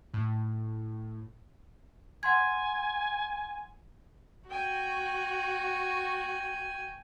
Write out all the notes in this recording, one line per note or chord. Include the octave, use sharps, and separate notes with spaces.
A2
F#5 G#5 C6 G#6
F#4 G5 G#5